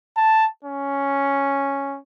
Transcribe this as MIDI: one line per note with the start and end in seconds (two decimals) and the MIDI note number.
0.17 0.45 81
0.65 1.97 61